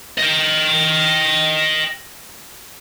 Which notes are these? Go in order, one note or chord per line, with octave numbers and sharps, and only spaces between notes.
D#5 G5